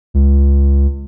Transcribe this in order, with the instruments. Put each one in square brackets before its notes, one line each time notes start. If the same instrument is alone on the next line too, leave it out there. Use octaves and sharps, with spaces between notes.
[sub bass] C#2